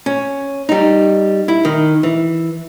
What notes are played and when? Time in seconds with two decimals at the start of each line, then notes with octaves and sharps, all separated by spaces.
0.06 C#4
0.69 G3 D#4
1.48 E4
1.65 D#3
2.03 E3